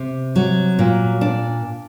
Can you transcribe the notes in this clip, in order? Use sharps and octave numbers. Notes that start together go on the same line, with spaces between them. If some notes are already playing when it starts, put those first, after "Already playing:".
Already playing: C3
F#3
A#2
D4